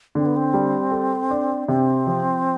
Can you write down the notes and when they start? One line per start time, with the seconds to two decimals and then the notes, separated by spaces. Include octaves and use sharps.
0.15 D3 C4
0.26 B3
0.36 C4
0.54 G3
0.91 A4
1.31 D4
1.68 C3 C4
2.07 F3